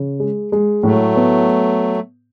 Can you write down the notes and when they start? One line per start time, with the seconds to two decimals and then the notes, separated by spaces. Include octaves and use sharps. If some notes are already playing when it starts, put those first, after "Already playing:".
Already playing: C#3
0.20 G#3
0.52 G#3
0.83 A2 F#3 A3
1.16 B3